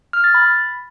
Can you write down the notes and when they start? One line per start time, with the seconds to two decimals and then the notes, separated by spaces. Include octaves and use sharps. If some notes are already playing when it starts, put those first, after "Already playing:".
0.13 F6
0.24 A6
0.34 B5